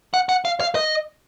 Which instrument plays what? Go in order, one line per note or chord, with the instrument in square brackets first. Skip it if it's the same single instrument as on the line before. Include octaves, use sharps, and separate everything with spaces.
[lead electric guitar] F#5
F#5
F5
F5
D#5